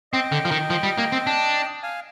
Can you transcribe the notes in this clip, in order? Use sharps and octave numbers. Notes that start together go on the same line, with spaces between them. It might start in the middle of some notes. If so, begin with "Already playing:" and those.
C4 D#5 G5
D3
F3
D#3
F3
G3
A#3
C4
D4
F5 G#5